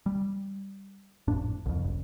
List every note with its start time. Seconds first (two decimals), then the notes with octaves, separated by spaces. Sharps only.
0.06 G3
1.28 G#1 F2 A2 D4
1.66 C2 F2
1.84 F#1